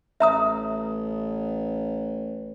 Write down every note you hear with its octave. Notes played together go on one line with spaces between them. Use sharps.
A1 E5 A#5 D#6